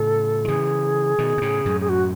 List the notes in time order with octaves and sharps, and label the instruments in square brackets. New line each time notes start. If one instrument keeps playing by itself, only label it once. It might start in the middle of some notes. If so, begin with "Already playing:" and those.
Already playing: [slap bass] A2 C#3 [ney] A4
[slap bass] D#3
[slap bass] C#3 E3 [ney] G#4
[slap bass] B2 D#3
B2
A2 C#3
F#2 A2
[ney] G#4
F#4